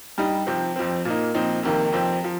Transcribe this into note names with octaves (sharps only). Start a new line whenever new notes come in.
G2 G3 D#4
C3 F3 C4
F2 F3 C4
A#2 A#3 D#4
A#2 F3 C4 D#4
F2 C3 D#3 A#3
F2 C3 F3 C4
F3